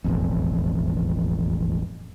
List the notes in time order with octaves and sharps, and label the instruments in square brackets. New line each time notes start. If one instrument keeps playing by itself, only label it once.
[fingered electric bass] E1 A1 F2